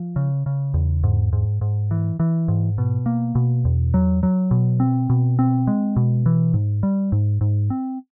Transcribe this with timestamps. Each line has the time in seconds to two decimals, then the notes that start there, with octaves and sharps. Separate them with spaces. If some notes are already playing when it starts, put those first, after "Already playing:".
Already playing: F3
0.16 C#3
0.46 C#3
0.74 E2
1.04 G#2
1.33 G#2
1.61 G#2
1.91 E3
2.20 E3
2.48 G#2
2.78 B2
3.06 A#3
3.35 B2
3.65 E2
3.94 F#3
4.23 F#3
4.51 B2
4.80 C4
5.10 B2
5.39 C4
5.67 G#3
5.96 B2
6.26 E3
6.54 G#2
6.83 G3
7.12 G#2
7.41 G#2
7.70 C4